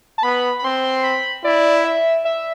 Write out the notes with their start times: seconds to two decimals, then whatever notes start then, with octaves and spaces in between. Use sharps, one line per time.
0.18 A5
0.23 B3 B5
0.59 B5
0.64 C4 C6
0.84 C6
1.04 B5
1.44 E4 D5
1.84 E5
2.25 E5